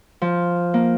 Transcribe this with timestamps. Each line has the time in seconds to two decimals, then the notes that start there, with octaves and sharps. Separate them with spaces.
0.22 F3
0.74 A#3